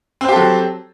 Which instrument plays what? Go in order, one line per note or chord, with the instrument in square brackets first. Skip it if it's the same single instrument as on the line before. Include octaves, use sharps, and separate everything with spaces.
[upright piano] C4
C5
G4
A4
F#3